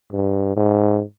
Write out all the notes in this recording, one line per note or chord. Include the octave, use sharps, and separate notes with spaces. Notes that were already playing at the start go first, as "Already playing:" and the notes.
G2
G#2